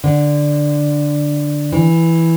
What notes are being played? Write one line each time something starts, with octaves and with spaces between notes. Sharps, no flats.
D3
E3